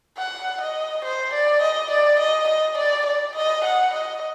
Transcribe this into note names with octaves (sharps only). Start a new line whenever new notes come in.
F#5
D#5
C5
D5
D#5
D5
D#5
D#5
D5
D5
D#5
F#5
D#5